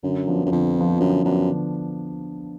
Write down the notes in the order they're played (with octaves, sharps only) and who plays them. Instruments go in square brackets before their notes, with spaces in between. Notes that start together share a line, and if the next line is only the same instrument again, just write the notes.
[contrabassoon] F#2 [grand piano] D3
[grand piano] F3 B3 D4
[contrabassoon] F#2
[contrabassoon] F2 [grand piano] D3
[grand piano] F3 B3 D4
[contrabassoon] F#2 [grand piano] D3
[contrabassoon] F#2 [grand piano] F3 B3 D4
[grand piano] D3